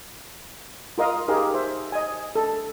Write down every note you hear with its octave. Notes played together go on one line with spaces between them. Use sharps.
F4 A#4 D#5 F5 D#6
D#4 G4 G#4 A#4 F5
C5 E5
D#5 G#5
A4